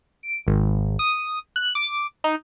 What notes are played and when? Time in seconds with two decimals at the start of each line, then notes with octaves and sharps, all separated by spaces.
0.23 D7
0.47 G#1
0.99 D#6
1.56 F#6
1.75 D6
2.24 D#4